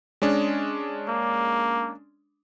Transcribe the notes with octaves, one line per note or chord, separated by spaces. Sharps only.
G#3 C#4 D4
A#3